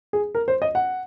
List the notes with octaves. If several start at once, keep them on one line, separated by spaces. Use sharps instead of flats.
G#4
A#4
C5
D#5
F#5